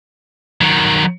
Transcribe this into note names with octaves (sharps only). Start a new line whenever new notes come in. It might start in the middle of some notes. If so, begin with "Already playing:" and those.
D#3 F#3